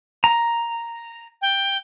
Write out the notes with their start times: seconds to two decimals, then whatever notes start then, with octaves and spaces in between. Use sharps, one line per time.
0.24 A#5
1.42 G5